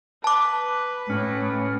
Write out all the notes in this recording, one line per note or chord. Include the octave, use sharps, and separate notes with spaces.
B4 A5 D6
A2 C#4